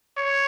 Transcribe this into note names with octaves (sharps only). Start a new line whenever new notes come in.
C#5